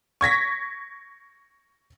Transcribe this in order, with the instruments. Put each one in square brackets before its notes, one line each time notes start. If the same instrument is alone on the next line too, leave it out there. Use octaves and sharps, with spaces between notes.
[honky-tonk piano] C#6 G#6 A#6 B6